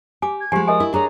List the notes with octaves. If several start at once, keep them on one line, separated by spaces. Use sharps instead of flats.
G4 G#5 D6
G#6
F3 G#3 F4 G4 G#5
A#4 D#5 G#5 D#6
E4 A#4
D4 G#4 C#5 A#5